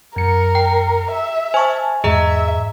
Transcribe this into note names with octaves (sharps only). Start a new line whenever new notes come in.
F#2 A#4 C#7
G5
E5
C5 G#5 A5 C#6
E2 G#2 G#4 D#5 E5 A#5